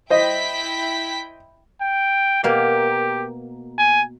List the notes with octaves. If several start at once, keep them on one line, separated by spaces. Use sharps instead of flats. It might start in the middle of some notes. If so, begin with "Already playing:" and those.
E4 C5 D#5 G5 B6
G5
B2 A#3 G4
G#5